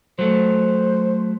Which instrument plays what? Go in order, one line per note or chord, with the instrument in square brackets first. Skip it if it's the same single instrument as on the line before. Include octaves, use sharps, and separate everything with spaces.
[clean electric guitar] F#3 A3 [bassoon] C5